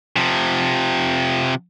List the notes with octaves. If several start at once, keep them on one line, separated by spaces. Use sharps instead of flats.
C3 F3